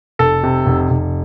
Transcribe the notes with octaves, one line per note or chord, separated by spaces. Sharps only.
F1 A4
C3
F1
F1